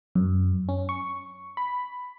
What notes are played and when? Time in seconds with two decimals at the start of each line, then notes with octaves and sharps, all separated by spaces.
0.15 F#2
0.69 C#4
0.89 C#6
1.57 B5